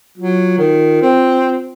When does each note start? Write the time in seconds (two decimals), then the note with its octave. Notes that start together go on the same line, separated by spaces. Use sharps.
0.18 F#3 F4
0.58 D#3
1.02 C4